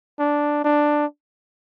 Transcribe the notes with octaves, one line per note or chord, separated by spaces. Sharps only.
D4
D4